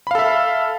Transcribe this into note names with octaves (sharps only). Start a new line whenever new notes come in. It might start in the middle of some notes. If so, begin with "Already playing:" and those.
A4 E5 F5 B5